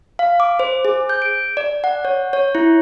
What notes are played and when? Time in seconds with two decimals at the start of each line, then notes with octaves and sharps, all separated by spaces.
0.19 F5
0.40 D6
0.59 C5
0.85 G#4
1.09 G6
1.22 D7
1.57 D5
1.84 F#5
2.05 C#5
2.33 C#5
2.55 E4